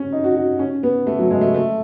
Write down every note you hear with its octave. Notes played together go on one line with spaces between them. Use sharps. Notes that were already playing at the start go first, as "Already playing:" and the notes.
Already playing: C#4
D#4
F#4
F#4
C#4
B3
A3
F#3
G#3
A3
A3